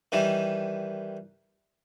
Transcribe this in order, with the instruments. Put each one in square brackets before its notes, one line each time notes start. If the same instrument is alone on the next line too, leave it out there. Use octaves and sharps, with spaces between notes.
[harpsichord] D#3 E3 G3